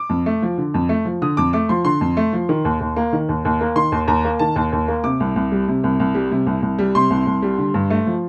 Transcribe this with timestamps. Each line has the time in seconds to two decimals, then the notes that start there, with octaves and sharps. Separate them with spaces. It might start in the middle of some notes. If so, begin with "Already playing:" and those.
Already playing: D6
0.09 F2
0.26 A3
0.42 F3
0.58 D3
0.74 F2
0.89 A3
1.05 F3
1.22 D3 D#6
1.37 F2 D6
1.53 A3 D6
1.69 F3 C6
1.85 D3 C6
2.01 F2
2.17 A3
2.33 F3
2.49 D#3
2.65 D#2
2.81 D#2
2.96 A#3
3.13 D#3
3.29 D#2
3.45 D#2
3.61 A#3
3.76 D#3 C6
3.92 D#2
4.08 D#2 A#5
4.25 A#3
4.39 D#3 A5
4.56 D#2
4.72 D#2
4.88 A#3
5.04 C3 D6
5.20 C2
5.36 C2
5.52 G3
5.68 C3
5.84 C2
6.00 C2
6.15 G3
6.31 C3
6.47 C2
6.62 C2
6.79 G3
6.95 C3 C6
7.10 C2
7.27 C2
7.42 G3
7.58 D3
7.74 G2
7.90 A3
8.06 F3